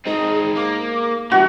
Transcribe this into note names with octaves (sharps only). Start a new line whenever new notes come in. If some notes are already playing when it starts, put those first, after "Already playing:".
G#2 C4 D#4 G#4
A#3 D6
G1 E2 G#2 F#4 E5